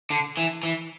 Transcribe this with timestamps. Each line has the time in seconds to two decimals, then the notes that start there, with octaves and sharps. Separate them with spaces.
0.10 D3
0.37 E3
0.63 E3